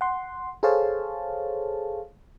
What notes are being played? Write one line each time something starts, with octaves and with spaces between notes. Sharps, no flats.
F#5 C6
G#4 A4 C5 C#5 F5 A5